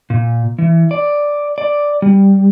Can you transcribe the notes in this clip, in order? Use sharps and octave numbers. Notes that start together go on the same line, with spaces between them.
A#2
E3
D5
D5
G3